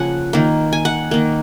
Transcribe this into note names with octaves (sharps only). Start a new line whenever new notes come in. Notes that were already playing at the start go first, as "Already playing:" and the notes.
Already playing: C#3 F3 A#3 F#5 G#5
D#3 A#3
G#5
F#5
D#3 A#3